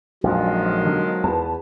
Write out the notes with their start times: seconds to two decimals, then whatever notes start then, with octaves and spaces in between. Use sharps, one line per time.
0.24 A#1 F2 D#3 F3 F#3 G#3
0.83 B1 D3 G3
1.24 E2 B4 A5